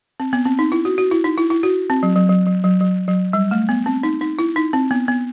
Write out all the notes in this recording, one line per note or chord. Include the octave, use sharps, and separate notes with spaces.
C4
B3
C4
D#4
E4
F#4
F#4
E4
D#4
E4
E4
F#4
C4
F#3
F#3
F#3
F#3
F#3
F#3
F#3
G3
A3
B3
C4
D#4
D#4
E4
D#4
C4
B3
B3